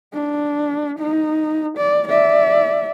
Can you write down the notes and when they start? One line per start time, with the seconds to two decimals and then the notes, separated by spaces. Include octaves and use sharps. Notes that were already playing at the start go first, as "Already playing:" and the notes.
0.13 D4
0.98 D#4
1.77 D5
2.07 D5 E5